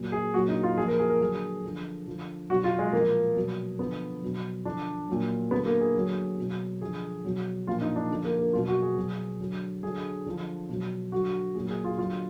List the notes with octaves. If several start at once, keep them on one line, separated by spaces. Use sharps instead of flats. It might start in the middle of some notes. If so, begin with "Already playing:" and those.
Already playing: A#2 F#3
G#4
A#2 F#3 F#4
D#4
F4
A#2 F3 G#4
A#4
G#4
A#4
D3 F#3 G#4
D3 F3
D3 F3
B2 F#3 F#4
F4
G#3
A#2 F3 A#3
B2 F#3
D3 F3 B3
B2 F#3
D3 F3 D4
A#2 F#3
D3 F#3 B3
A#3
G#4
D3 F#3
B2 F#3
D3 F3 G#4
B2 F#3
A#2 F3 F4
D#4
D4
D3 F3
A#3
A#3
B2 F#3 F4
F#4
G#4
B2 F#3
D3 F#3
D3 F#3 G#4
D3 F3
B2 F#3
D3 F#3 F#4
A#2 F#3 G#4
G#4
F4
D3 F#3 F4